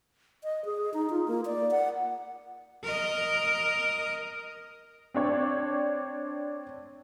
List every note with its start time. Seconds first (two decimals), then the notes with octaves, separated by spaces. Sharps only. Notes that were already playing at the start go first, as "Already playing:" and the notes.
0.44 D#5
0.65 G#4
0.94 D#4
1.10 F4
1.28 A#3
1.46 D5
1.71 F#5
2.84 A#4 D#5
5.14 C4 D4 C#5